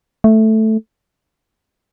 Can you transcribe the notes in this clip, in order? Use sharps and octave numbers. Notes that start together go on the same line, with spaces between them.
A3